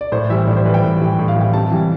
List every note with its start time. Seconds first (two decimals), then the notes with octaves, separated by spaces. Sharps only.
0.01 D5
0.12 A2 C5
0.30 E3 G3 E5
0.47 A2 D5
0.56 C5
0.65 E3 B4
0.68 G3
0.74 G5
0.83 A2
1.01 E3 G3
1.19 A2
1.28 F5
1.36 E3 G3 G5
1.53 C3 A5
1.72 E3 G3